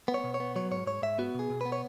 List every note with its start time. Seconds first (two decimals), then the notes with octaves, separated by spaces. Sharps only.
0.08 B3
0.14 C#5
0.24 B2
0.34 C#5
0.40 B3
0.56 F#3 C#5
0.71 G#2 C#5
0.86 G#2 C#5
1.02 G#2 E5
1.18 B3 F#4
1.35 B2 G#4
1.50 B2
1.61 B3 B4
1.72 C#5